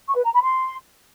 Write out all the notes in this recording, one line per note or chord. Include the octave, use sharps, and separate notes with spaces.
C#6
B4
A#5
B5
C6